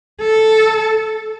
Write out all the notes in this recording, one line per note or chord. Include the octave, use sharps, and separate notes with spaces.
A4